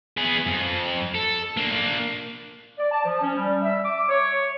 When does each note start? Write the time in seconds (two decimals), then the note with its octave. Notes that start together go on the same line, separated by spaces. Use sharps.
0.18 B3 G#4
0.47 F2
1.15 A4
1.57 A#3 D4
2.78 D5
2.92 A5
3.04 F3
3.21 C#4
3.36 G3
3.62 E5
3.84 D6
4.09 C#5